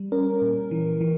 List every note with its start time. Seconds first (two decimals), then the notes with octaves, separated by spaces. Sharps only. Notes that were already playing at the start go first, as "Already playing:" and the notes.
Already playing: G3
0.12 C#4 A#4
0.42 A#2
0.71 E3
1.01 E3